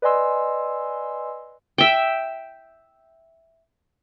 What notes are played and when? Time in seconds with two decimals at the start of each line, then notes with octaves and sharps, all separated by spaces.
0.02 B4 D5 D#5 G#5 C6 E6
1.78 E5 G5